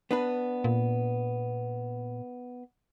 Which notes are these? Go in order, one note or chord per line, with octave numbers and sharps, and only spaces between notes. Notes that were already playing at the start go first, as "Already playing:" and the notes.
B3 D4 B4
A#2